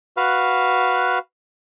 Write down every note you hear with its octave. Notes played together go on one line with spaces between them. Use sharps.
F#4 B4 F5